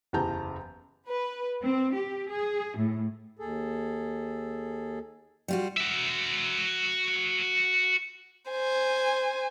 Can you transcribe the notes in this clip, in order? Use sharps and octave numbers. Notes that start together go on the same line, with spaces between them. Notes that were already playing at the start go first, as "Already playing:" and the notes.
F#1 E2 G4 A5 A#5 G6
B4
C4
G4
G#4
A2
D#2 G#4 A4
G3 F4 F#4
F#4 E5
C5 G#5